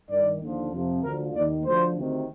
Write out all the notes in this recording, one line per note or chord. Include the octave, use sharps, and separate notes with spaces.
G2 D#3 D5
D#2 D3 F3
F2 C3 F3
D2 D3 F3 A#4
D#2 D#3 D5
D2 D3 F3 C5
D2 C3 D#3